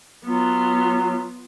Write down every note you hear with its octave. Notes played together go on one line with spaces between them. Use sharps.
F#3 B3 F4